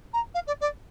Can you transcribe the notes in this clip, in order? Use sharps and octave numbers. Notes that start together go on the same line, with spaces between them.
A#5
F5
D5
D5